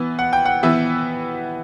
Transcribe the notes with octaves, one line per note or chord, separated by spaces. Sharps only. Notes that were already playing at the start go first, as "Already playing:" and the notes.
Already playing: E3 B3
F#5
G5
F#5
E3 B3 E5